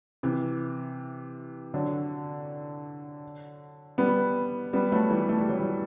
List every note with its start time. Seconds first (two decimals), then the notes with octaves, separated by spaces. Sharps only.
0.23 C3 E3
1.74 D3 F#3
3.98 G3 B3
4.73 G3 B3
4.92 F#3 A3
5.10 E3 G3
5.29 A3
5.39 G3
5.49 F#3
5.60 E3 G3